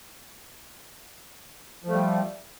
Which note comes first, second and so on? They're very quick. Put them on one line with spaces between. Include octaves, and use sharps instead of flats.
F3 A3 G3